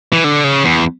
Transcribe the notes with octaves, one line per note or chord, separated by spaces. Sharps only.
E3
D3
C#3
E2